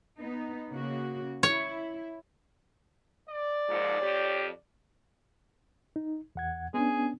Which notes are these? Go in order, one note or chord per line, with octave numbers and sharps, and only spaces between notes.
B3 D#4
C#3 A#3 F#4
E4 C#5
D5
D#2 G#2 F3
F2 G4 C#5
D#4
E2 F#5 G#6
B3 C#4 D4 G#4